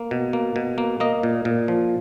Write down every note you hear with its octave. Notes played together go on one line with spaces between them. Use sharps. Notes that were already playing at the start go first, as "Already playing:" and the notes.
Already playing: A#3
B2
A#3
B2
A#3
A#3 D#5
A#2
A#2
F3